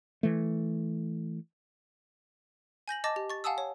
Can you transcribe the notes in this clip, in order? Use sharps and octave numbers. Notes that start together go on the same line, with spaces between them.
E3 A3
G#5 G6 A#6 F#7
D#5 A5 D6 A6 A#6
G4
C#6 A6
F5 F#5 G#5 A5 D#6 E6
C#5